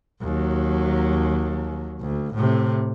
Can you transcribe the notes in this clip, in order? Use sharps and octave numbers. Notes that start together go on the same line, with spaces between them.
D#2 F#3
D2
A2 C3